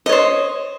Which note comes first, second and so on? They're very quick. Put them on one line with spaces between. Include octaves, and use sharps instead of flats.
D#5 C#5 C5